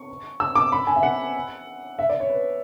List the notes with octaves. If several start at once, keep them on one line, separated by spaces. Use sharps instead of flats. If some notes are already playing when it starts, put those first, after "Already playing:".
Already playing: C#6
E6
D6
B5
G#5
E5
F#5
E5
D5
C#5
B4